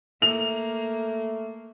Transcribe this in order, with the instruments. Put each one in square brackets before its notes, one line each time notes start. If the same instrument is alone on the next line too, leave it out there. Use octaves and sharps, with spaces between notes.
[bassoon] A3 [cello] A#3 [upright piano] F7